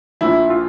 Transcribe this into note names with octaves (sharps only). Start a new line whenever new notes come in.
A#1 A#2 F3 E4
F4